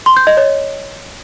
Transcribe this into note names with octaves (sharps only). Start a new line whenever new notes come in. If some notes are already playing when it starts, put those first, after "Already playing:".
C6
G6
D#5
C#5